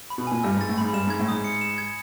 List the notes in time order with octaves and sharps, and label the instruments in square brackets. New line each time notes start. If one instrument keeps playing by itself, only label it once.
[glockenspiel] B5
[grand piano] B2
[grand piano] A#2 [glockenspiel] G#5
[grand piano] G2 [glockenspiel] E6
[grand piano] G#2
[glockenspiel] A6
[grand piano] A2
[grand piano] G#2 [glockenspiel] B5
[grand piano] G2 [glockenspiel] E7
[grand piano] G#2 [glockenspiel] G#6
[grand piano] A2
[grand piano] G#2 [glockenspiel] D#6
[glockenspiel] C#7
E7
G#6